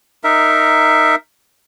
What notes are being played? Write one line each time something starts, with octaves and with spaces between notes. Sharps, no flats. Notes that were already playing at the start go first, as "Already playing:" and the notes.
D#4 A#4 E5